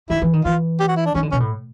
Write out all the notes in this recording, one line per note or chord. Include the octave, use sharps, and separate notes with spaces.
D#3 E4
E3
D#3
E3 F4
G4
F#4
E4
D4
D#3 C#4
D3
B2 C#4
A2